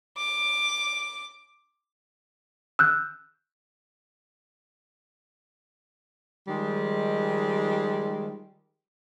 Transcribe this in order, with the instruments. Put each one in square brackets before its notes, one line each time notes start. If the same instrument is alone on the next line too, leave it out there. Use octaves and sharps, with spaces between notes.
[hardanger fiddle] D6
[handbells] E6 F#6 G6
[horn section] D#3 F3 G3 G#3